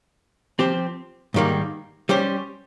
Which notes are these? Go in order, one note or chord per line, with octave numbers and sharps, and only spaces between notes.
F3 C4 G4 C5
G#2 D#3 G3 A#3
G3 C#4 G4 C5